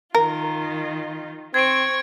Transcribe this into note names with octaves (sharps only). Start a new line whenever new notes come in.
D#3 F4 A#4
C4 C#6 G#6 D7